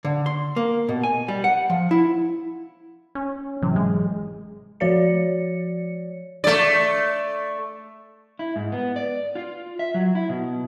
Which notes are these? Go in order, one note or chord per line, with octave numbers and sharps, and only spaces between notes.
D3
C6
A#3
B2
G#5
G3
F#5
F3
E4
C#4
G#1 C3 E3 F#3
G#3
F3 F#4 C#5 D5 C#7
A3 D5
E4
G#2
B3
D5
F4
E5
F#3
E4
B2